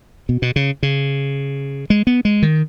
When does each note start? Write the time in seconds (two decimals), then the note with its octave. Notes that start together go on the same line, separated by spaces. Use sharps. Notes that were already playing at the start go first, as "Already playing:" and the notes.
0.29 B2
0.42 B2
0.56 C#3
0.83 C#3
1.90 G#3
2.07 B3
2.25 G#3
2.42 D#3